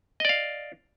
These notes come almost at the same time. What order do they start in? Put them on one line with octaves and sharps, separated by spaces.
D#5 D5 F5